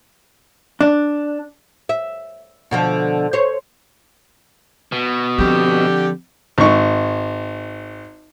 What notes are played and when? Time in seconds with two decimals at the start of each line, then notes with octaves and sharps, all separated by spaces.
0.81 D4
1.89 E5
2.71 B2 D3 F3
3.33 C5 C#5
4.92 B2
5.38 D3 F3 C4 G4
6.58 G#1 C#6